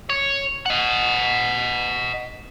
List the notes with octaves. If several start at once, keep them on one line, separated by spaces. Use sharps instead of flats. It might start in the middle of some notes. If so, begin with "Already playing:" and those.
C#5
D#5 F#5